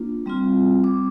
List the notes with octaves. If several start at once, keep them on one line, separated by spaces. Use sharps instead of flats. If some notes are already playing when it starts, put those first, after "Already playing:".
Already playing: A#3 D4 F4
G3 C4 F4
D6